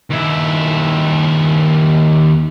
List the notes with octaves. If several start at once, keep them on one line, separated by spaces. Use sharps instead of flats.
D#2 E4